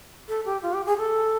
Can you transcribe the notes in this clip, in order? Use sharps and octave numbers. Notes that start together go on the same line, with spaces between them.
A4
G4
F4
G4
G#4
A4